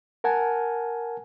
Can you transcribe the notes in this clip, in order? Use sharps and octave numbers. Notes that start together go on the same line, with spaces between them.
A#4 F#5 G#5 A5